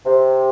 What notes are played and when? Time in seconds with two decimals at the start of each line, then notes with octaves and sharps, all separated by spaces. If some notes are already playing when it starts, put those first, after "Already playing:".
0.05 C3